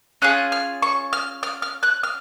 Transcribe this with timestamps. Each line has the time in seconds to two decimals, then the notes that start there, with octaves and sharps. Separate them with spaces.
0.22 C#4 F4 G#4 F#6
0.52 F6
0.82 C#6
1.13 F6
1.43 F6
1.62 F6
1.83 F#6
2.03 F6